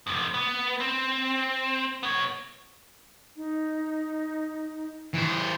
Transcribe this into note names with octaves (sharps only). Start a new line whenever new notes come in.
F2 C3
B3
C4
B3 C#5
D#4
E3 C5